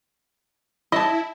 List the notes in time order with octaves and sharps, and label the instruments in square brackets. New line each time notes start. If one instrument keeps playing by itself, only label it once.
[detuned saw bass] E4 [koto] D#5 E5 A5